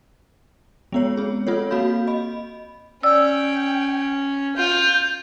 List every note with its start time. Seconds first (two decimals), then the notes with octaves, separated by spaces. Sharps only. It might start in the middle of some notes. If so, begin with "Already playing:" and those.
0.92 G#3 B3 C#5
1.17 C4 G#4
1.47 C4 F4 A4 C#5
1.71 A#3 F#4 F5 B5 G6
2.07 D#5 B5
3.03 C#4 D5 G5 E6
4.56 F4 G6